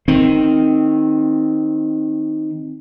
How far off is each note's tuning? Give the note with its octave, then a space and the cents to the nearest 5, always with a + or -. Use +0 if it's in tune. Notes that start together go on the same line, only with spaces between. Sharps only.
D#3 +0 C4 +5